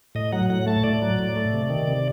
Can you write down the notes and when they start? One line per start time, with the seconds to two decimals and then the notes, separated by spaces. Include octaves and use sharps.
0.15 A2 D#5
0.32 F#3 F#5
0.50 A2 F#5
0.66 A3 A5
0.84 A2 D5
1.02 F#3
1.19 A2
1.36 A3
1.53 C3
1.70 D#3
1.87 C3